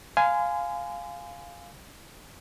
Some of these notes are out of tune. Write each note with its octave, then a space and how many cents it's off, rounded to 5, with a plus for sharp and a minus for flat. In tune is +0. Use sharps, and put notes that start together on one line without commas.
F5 +0 G#5 +5 C6 -35